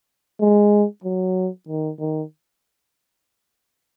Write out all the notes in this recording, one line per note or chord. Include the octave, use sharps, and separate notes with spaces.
G#3
F#3
D#3
D#3